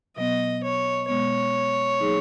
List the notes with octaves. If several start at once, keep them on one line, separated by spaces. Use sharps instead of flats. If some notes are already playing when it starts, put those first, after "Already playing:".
B2 F#3 B3 D#5
C#5
B2 G#3 B3 C#5
F#3 A#3 D#4 G#4